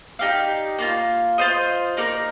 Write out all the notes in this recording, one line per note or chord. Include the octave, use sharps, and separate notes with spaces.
D#4 G4 D5 F5
A#3 D4 F4
F4 C5 D#5
A#3 D#4 A#4 D5